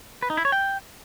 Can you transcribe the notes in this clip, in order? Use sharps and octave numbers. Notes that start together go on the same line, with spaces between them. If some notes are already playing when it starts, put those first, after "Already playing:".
B4
D#4
E4
C#5
G5